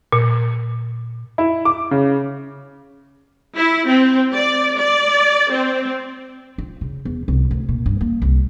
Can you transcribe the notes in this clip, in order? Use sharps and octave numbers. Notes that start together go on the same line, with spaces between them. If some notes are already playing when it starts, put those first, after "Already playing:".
A#2
E4
D6
C#3
E4
C4
D5
D5
C4
F4
C#3
E2
C2
D2
A#2
G2
A#3
C2